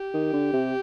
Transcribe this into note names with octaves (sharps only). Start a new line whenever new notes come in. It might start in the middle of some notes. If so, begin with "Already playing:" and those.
Already playing: G4
D#3
D3
C3